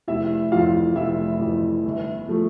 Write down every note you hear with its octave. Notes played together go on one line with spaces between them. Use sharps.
F1 E4 E5
F2 E3 F4 F5
F1 E4 E5
F2 E3
G1
F3 A3